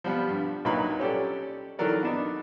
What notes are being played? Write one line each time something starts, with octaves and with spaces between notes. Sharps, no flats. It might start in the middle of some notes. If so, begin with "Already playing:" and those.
F3 G3 B3
G2
C2 A#2 F#3 D#4 B4 B5
C#4 G4 A4 D5
D#3 E3 F#3 A4 A#4 D5
B3 D4 D#4